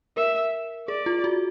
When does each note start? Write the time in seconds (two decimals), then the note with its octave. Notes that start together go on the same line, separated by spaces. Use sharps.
0.17 A#4 E5
0.88 G#4 D5
1.06 F4
1.24 F#4